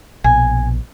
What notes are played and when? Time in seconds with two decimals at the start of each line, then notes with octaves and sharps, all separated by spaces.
0.24 A#1 B2 G#5